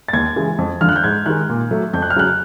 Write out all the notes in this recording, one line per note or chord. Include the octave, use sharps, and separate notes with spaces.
A6
D#2 G#6
C#3 E3 G#3
F2
D3 F3 F6
F#6
G6
G#2 G#6
D#3 G#3 F#6
A#2
F#3 A3
F2 G6
F#6
F6
C#3 F#3 F#6